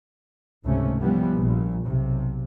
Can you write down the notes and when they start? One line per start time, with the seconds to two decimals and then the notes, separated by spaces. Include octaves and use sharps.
0.64 G#1 C#2 C3 A3 C#4
1.01 E3 F3 G3 B3
1.35 A#1 A#2
1.85 B1 C3